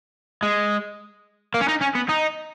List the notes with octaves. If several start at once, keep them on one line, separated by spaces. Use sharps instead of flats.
G#3
A#3
C#4
D#4
C#4
B3
D#4